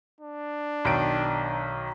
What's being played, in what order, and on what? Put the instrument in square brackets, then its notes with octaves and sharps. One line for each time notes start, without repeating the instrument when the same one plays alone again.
[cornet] D4
[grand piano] B1 D#3 D7